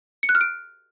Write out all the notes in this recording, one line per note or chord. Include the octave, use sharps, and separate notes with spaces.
C#7
F#6
F6
D7